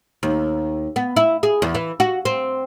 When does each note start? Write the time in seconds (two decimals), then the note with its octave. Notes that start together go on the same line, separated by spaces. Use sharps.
0.23 D#2
0.96 B3
1.16 E4
1.43 G#4
1.62 E2
1.75 E3
2.00 F#4
2.25 C4